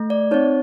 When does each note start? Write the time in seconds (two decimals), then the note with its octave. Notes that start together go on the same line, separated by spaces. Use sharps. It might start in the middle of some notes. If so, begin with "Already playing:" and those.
Already playing: A3
0.10 D5
0.31 C4 D#4 C#5